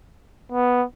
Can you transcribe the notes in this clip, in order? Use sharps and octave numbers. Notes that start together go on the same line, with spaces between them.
B3